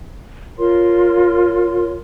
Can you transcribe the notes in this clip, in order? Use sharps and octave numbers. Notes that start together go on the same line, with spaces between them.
F4 A#4 C#5 C6